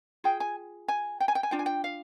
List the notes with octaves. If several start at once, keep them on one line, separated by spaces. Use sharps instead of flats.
F4 G#4 G5
G#5
G#5
G5
G#5
G5
G#5
D4 F4 G5
G#5
G5
F5